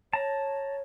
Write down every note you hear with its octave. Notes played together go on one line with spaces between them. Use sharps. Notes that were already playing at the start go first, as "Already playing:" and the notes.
C#5 A5 A#5